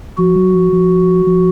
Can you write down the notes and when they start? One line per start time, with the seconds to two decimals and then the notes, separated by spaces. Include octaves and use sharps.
0.18 F3 F#4
0.36 F#3
0.55 F3
0.73 F3
1.27 F3